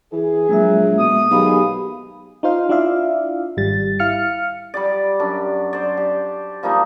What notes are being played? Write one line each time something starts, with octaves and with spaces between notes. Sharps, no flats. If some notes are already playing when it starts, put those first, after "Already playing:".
E3 G#4
A#1 F#3 G#3 A#3 E5
B2 D#6
B1 D#3 G#3 G4 G#4 F5 B5
D#4 F4 C5 F5
D4 E4 F4 D5 E5 F5
G#1 G3 A6
E4 F5 F6 C#7
G3 G4 D5
F#2 D4
C5 D5
G4
F3 G3 A#3 D#4